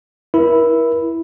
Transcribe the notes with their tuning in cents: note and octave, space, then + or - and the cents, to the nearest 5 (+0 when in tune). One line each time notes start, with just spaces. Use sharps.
E4 +0 A#4 +40